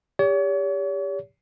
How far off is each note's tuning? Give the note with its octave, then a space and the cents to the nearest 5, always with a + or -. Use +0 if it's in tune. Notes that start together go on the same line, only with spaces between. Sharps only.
G4 +30 C#5 +40